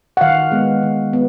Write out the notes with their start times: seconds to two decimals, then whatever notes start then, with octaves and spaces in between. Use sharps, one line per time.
0.17 F#5
0.21 D#3 F5
0.52 G#3 B3
0.83 D#3
1.13 B3